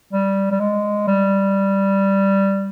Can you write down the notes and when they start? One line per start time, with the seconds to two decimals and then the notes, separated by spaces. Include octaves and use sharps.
0.13 G3
0.52 G3
0.60 G#3
1.07 G3